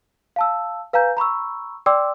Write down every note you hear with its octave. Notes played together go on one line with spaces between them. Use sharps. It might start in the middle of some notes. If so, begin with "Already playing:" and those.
F5 A5 E6
B4 F5 G#5 A#5 G6
A#5 B5 C#6 E6
D5 G5 C6 D6 E6